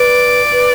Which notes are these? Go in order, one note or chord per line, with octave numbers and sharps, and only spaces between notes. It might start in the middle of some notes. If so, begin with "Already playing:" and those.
Already playing: B4 D5
B4